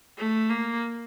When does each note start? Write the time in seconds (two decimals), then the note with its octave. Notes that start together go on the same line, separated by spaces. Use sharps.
0.17 A3
0.49 A#3